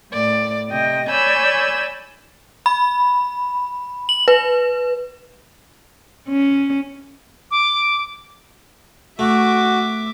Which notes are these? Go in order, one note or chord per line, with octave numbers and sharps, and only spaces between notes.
A2 D5
C3 D#5 G5 A#6
C#5 D5 G#5 B5 E6 G6
B5
F#7
B4
C#4
D6
A3 F#4 E5 D6